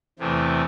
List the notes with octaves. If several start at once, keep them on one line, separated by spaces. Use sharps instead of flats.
E2 C3 E3 A3